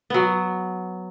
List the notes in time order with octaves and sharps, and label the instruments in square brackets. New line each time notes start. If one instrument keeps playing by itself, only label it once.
[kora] F#3 B3